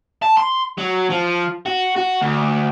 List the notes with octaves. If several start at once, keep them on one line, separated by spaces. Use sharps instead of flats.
A5
C6
F#3
F3
F#4
F#4
D2